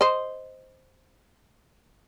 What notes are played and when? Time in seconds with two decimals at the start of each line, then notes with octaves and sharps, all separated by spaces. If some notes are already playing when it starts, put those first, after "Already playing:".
0.01 C5 D#5